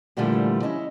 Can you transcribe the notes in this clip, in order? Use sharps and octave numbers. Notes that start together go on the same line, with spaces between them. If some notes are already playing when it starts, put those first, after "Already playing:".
A#2 D3 E3 F3 G3 A3
C#4 E4 D#5